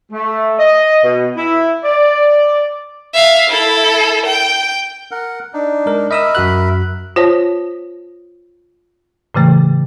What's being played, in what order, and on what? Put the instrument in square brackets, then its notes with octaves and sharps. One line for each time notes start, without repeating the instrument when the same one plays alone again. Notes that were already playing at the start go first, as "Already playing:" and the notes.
[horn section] A3
D#5
B2
E4
D5
[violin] E5 F5
E4 A4
G5
[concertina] A#4 F#5
D4 D#4
[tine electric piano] G#3 A#4
[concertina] A#4 E5 B5 [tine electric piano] D#5 D#6 E6
[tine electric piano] F#2 F#4 F#6
[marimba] F4 C5 C#5 A5 A#6
A2 C#3 E3 A3